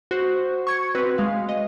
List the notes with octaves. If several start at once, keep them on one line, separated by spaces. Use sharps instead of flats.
F#4 C5
C#6 G#6 C#7
C4 F#4 B4
G#3 F5
D#5